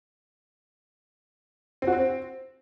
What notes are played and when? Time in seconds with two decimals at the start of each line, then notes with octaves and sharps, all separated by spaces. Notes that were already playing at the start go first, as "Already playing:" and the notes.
1.82 C4
1.87 F#4
1.93 C4